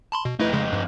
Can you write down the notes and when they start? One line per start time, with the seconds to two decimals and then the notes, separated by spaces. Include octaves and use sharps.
0.12 A5 B5 C6
0.25 B2
0.40 F2 A3 D#4 E4 B4
0.53 C#3 G#3
0.73 G2